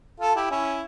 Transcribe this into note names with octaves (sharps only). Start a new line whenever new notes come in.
F4 A4
E4 G4
C#4 E4